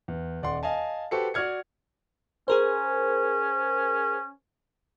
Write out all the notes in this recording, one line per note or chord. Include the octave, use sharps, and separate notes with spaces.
E2
D#1 D5 F#5 C6
D#5 F5 G#5 A5
F#4 G4 A4 B4 C5 C#7
F#4 D5 F6 G#6 C#7
C#4 G#4 A#4 C5